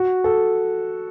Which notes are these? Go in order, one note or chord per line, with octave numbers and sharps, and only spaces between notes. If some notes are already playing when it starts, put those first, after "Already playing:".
Already playing: F#4
A4